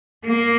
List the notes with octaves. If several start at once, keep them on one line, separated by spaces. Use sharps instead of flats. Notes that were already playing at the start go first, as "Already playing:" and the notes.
A#3